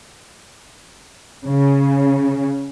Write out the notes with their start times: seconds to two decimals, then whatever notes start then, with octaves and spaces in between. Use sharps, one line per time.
1.46 C#3